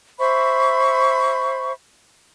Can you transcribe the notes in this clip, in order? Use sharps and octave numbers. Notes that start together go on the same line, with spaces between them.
C5 E5 B5 C#6